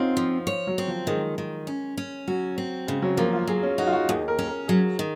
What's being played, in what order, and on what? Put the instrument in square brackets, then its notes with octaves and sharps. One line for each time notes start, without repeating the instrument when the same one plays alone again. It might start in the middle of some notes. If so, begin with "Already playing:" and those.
Already playing: [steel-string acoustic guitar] C4 [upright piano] C#4 D#4 F4 F#4
[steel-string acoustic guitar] F3
C#5
[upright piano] F#3
[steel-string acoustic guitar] C4
[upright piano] F3
[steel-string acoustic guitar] D#3 [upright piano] G#3
[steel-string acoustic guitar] D#3
C#4
C#4
[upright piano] F#3 [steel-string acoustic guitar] F#4
[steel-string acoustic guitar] C4
[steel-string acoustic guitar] C#3 [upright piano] G#3
[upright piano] F#3
[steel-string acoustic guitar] F3 [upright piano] A#3
[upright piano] F4
[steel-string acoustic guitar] F#3 [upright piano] G#4
[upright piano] C#4
[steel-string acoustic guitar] D#4 [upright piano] F#4
[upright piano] F4
F#4
[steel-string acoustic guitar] D#2 [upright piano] G#4
[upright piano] A#4
[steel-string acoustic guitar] C#4
[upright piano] A#4
[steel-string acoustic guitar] F#3 [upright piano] G#4
[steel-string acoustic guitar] D#3